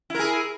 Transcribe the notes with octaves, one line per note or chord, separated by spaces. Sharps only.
E4 G#4 A#4